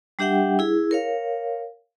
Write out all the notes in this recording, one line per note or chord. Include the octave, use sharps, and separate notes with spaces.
G3 D4 G4 E5 F#5 G5
E4 G#4
A#4 C#5 F5